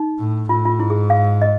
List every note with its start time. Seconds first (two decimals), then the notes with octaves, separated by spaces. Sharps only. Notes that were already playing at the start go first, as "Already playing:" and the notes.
Already playing: D#4
0.19 A2
0.49 A2 F4
0.65 F4
0.79 G#2 E4
0.90 G#4
1.10 F5
1.42 D#5